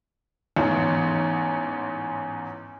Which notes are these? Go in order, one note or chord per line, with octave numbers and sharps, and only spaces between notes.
A1 E2 G#2